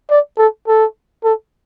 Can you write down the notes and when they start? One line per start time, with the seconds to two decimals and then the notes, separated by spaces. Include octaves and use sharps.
0.11 D5
0.38 A4
0.68 A4
1.24 A4